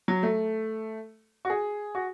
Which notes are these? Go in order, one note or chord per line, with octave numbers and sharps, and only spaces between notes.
F#3
A3
F#4
G#4
F#4